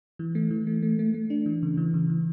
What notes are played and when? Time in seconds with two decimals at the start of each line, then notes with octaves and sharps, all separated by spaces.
0.19 E3
0.35 A3
0.51 E3
0.67 A3
0.82 A3
0.99 A3
1.14 A3
1.30 D4
1.46 E3
1.63 C#3
1.77 E3
1.94 C#3
2.10 E3